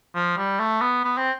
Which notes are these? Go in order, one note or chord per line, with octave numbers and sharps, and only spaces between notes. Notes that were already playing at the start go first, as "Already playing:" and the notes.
F3
G3
A3
B3
B3
C4